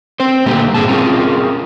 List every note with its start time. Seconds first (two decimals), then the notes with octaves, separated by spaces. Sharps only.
0.20 C4 C5
0.46 A#2 D3 G3 A3 A#3 G4
0.74 G2 G#4 A5
0.88 C4 C#4 F4 G#4 A#4